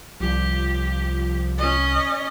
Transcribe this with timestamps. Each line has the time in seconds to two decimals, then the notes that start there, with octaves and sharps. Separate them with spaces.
0.20 C2 F3 G4
1.58 C#4 D#5